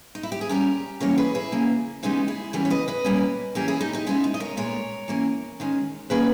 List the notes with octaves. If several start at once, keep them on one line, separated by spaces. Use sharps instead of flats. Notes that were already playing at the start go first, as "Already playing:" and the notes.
D#4
E4
G4
G#4
A#2 G3 C#4 G4 A#4
E3 G3 A#3 C#4 A#4 C#5
G#4 B4
E4 G#4
C#3 E3 A#3 C#4
C#3 E3 G#3 B3 D#4 G4
E4 G#4
C#3 E3 G3 B3 G4 A#4
C#5
B4 D#5
B4 D#5
A#2 G3 A#3 C#4
E3 A#3 C#4 G4 A#4
E4 G#4
D#4 G4
D#4 G4
C#3 G#3 B3 C#4 E4
D#4
D#5
A#4 C#5
A#2 G#3 B3 A#4 C#5
E3 A#3 C#4
D#3 G#3 C#4
D#3 A#3 C#4 G#4 B4